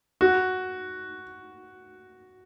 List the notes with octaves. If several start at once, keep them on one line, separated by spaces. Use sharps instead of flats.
F#4